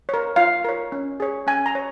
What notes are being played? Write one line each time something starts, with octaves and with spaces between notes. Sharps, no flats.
A#4 C#5
F4 F5
A#4 C#5
C#4
G#4 C#5
C#4 G#5
A#5
C#5